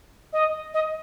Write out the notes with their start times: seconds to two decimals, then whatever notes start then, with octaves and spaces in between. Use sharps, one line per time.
0.33 D#5
0.74 D#5